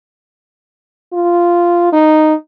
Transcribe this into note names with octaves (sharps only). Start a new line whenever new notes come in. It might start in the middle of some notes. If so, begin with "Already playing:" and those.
F4
D#4